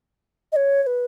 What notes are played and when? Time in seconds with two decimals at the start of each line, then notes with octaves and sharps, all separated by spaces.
0.52 D#5
0.56 C#5
0.83 C#5
0.87 B4